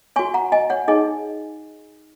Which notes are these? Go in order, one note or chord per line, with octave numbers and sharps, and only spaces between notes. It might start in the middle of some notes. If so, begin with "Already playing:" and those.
F#4 C#5 G#5 C#6
F#5 A#5
D#5 G#5
C#5 F#5
D#4 G#4 C#5 D#5 G#5